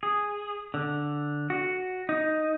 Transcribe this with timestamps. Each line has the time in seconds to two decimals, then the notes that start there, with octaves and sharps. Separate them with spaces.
0.03 G#4
0.74 D3
1.50 F#4
2.09 D#4